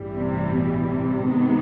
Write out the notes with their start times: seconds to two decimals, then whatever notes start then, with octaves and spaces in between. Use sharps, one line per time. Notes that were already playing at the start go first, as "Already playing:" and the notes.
Already playing: A1 G2 E3 G3
0.15 C3
0.52 B2
0.89 C3
1.27 G2 D#3 G#3 B3 D#4